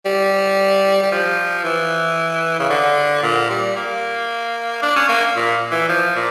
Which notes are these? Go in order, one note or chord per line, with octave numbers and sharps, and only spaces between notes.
G3
G3
F3
E3
C#3
D3
A#2
G3
A#3
D4
C#4
A#3
A#2
E3
F3
A#2